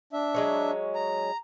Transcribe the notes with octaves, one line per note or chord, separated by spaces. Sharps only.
D4 E5
F#3 G#3 C#4
A#5